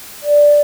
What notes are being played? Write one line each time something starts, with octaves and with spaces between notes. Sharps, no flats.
D5